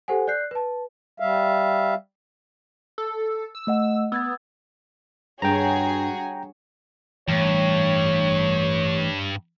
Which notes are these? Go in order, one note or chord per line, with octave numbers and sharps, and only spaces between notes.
G4 A4 C5 F#5 G#5
D5 F#6 G6 C7
B4 A5
G3 E5 F5
A4
E6
A3 D#5 F#5
B3 E6 G#6 A6
G2 F#4 G#4 C#5 G5 A#5
G2 E3 A3 C#5